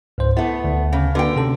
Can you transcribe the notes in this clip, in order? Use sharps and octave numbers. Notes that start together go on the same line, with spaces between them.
C#2 G#2 C5
A3 B3 E4
D2
C#3
D3 A#3 F#4 B4 G5
C3 C#4 A4